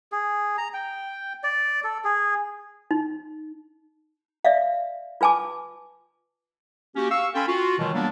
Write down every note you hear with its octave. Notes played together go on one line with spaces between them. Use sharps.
G#4
A#5
G5
D5
A4
G#4
D#4
D5 E5 F5
F4 B4 G#5 A5 D6
A#3 C#4 F#4 G4
F5 C#6 E6
C#4 A4 G5 G#5 B5 C6
F4 F#4
B2 D#3 E3 F#3 G#3
F#3 G3 A#3 B3 D4